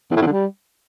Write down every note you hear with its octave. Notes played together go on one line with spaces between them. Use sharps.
E2
A2
E2
D3
G3